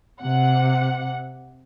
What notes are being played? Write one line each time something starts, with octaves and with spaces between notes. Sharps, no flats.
C3 F#5